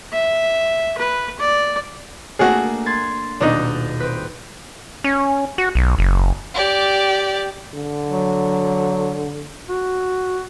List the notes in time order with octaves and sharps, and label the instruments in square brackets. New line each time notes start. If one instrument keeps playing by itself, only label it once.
[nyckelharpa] E5
B4
D5
[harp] A3 A#3 D4 [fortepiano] F#4 G#4
[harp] C6 G#6 A6
[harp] D#1 B2 F#6 [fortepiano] D4 D#4
[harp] C4 B4
[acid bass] C#4
F#4
B1
F#1
[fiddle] G4 D5
[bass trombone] D3
[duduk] F#3
F#4